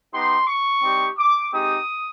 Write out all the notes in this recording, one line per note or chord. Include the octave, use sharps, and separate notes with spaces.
B3 D#4 G4 C6
C#6
G3 C4 D#4 G4
D6
G#3 C4 D#4 G4 D#6